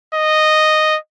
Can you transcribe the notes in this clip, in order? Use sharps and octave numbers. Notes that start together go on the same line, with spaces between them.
D#5